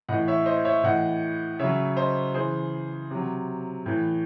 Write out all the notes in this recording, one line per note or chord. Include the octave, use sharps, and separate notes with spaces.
A2 E3 D#5 F#5
C#5 E5
C5 D#5
C#5 E5
A2 E3 D#5 F#5
C#3 F#3 C#5 E5
C5 D#5
C#3 E3 G#4 C5
C3 F#3
A2 E3